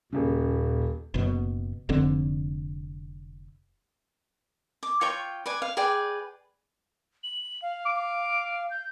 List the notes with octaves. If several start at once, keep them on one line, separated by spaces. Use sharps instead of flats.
D#1 D#2 A#2 C#3
F#1 B2
F1 D3 C4
D6
F4 C#5 G5 C#6
B4 D5 G#5
F5
G#4 B4 D5 G5
F#7
F5
D6
G6